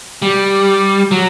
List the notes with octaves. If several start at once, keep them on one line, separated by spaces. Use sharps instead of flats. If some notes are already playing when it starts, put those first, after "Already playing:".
G3
F#3